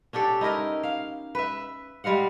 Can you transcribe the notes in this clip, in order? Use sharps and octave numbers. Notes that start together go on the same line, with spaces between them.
C#4 D4 G4 A4
D#4 E4 A#4 D#5
F5
B4 E5
G3 G#3 F5 F#5